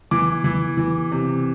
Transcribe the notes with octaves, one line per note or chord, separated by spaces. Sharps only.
E3 D6
E3
E3
C3